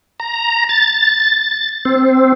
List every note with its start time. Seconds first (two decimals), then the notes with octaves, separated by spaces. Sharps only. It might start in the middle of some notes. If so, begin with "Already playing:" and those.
0.20 A#5
0.69 A6
1.85 C4